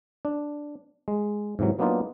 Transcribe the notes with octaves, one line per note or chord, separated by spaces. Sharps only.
D4
G#3
G#2 C3 E3 F#3
F#3 A#3 B3 D4 D#4 F4